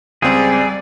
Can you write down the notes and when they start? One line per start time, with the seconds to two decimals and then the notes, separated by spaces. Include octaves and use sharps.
0.22 C#2 G3 C4 G#4 D5